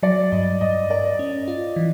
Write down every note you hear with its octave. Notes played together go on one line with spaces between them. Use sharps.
F#3 D5
G2 D#5
G2 D#5
A#4 D5
C#4
F4
E3